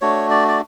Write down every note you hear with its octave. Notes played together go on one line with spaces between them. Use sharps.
A3 D4 F#4 C#5
D5
D5